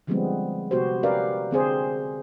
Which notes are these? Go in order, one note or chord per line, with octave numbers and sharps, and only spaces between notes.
D3 F3 G3 G#3 B3 C4
C3 B3 F#4 G4 C5
C#4 G4 A#4 B4 D5 F5
D3 C4 G#4 C5